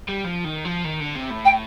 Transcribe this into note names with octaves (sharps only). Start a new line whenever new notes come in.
G3
F3
D#3
F3
D#3
D3
C3
A2
G5